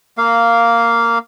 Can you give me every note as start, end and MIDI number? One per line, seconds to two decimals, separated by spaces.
0.18 1.18 58
0.18 1.18 77